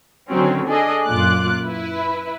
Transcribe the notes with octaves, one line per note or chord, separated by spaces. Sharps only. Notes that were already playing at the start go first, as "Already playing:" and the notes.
D3 D#3 F#3 C4 C#4
D4 G#4 A4 D#5
F#2 A#2 F4 D6 F#6
E4 B4